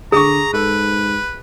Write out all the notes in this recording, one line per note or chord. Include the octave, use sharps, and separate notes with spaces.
D3 G#4 A#5 C#6 D#6
G#2 A4 B4